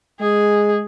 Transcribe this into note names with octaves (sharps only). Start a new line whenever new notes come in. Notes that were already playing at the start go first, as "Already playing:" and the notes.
G#3 G#4